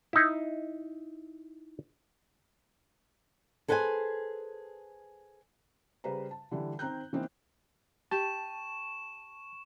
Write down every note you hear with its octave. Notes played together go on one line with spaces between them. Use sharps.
D#4 E4
G#4 A4 B4 C5 F#5 G#5
C#3 G3 B4 C5 A#5
A5
D3 E3 G3
D#3 C4 A#5 F#6 G6
E3 A#3 C4 D#4
G4 A5 C#6 E7